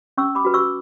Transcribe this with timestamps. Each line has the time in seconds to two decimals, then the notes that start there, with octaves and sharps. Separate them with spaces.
0.18 C#4 C#6 E6
0.35 B5 D6
0.45 F#4 B4
0.54 C#6 E6